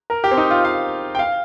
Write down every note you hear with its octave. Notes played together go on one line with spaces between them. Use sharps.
A#4
G4
C4
D#4
F4
F5
G5
F5